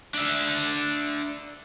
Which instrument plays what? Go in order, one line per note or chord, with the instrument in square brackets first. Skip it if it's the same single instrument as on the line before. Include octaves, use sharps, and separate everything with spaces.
[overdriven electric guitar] D4 E5